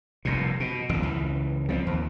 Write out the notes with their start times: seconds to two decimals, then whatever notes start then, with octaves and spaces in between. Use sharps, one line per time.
0.25 F1 G2 A#2
0.60 B2
0.89 G#1 F2 D3
1.03 C#2 E3
1.69 F3 A3 C4
1.87 D#2